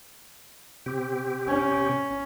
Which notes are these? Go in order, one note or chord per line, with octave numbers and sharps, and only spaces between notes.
C3 C4 G4
C#4